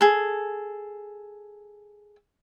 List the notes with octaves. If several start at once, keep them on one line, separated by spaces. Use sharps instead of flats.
G#4 A4